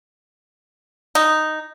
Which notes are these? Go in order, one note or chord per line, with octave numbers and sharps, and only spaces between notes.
D#4